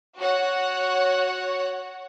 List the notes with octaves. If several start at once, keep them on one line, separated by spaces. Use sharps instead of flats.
F#4 C#5 F#5